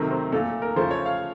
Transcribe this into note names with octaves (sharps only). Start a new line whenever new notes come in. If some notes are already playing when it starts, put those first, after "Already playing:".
Already playing: C3 D#3 F#3 A3 A#4
C5
A#2 A3 A4
A#4
C#3 F3 A3 C5
C#5
F5